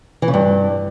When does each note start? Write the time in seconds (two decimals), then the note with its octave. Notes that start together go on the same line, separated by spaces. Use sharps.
0.22 E3
0.28 C#3
0.34 G2